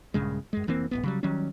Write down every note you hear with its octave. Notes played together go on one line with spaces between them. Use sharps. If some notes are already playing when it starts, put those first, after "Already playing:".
A#1 G2 C#3 G#3
F#2 G#3
F1 E3 A#3 C4
D1 A1 B3
C#3 F#3 G3
D#3 F#3 G3 C#4